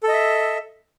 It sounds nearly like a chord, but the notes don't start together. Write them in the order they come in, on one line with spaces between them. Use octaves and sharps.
A4 D#5 E5